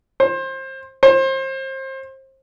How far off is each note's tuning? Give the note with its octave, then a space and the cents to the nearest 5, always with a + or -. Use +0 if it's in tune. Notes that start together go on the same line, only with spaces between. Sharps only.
C5 +25
C5 +30